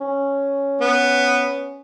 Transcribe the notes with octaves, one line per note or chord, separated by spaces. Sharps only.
C#4
B3